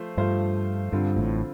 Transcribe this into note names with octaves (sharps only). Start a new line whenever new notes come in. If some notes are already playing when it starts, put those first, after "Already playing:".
Already playing: F3 A3 F4 C5
G2 F3 A3 F4 C5 F5
G2 D3 G3 C4 F4
A1 A2